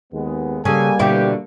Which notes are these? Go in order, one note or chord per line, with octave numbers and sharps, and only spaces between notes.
D#2 G#3 B3
C#3 G3 A#3 A4 G#5
B2 D3 E4 G4